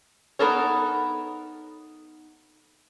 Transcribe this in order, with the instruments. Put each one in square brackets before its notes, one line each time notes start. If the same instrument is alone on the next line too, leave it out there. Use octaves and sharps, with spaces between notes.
[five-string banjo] B3 D#4 A4 A#4 C#5